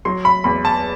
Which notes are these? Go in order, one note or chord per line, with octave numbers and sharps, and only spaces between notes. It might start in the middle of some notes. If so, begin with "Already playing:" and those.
F#3 C6
B5
E2 B5
A5